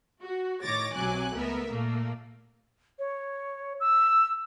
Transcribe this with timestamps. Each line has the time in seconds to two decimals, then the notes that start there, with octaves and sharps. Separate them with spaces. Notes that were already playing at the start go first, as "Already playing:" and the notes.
0.23 F#4
0.63 A2 D#3 C#5 D6 A6 A#6
0.95 B1 C3 F#3 G#5 D6 F#6
1.34 C#2 A3 B3 A#4 E5
1.71 A#2 A3 A#3
2.99 C#5
3.80 E6